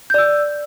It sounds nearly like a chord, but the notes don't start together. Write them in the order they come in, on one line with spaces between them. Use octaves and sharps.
G6 D5 E6